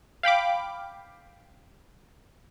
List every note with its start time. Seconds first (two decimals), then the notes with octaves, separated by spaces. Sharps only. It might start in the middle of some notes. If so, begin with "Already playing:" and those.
0.23 F5 G5 B5 D6